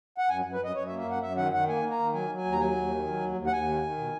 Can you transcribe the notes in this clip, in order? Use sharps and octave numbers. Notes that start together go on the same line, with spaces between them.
F#5
F#2 G#5
F#2
B4
F#2 D#5
F#2 C#5
E5
A#3
E5
F#2 F#5
F#2 E5
D#3 F#5
D#3 F#5
A#3 G#5
A#3
A#5
D#3
F#3 G#5
F#3
G#5
D#2
A#5
F#3 G#5
D#2
D#3
F#3
D#2
D#2
F#5
D#2 G#5
D#3
D#3
B2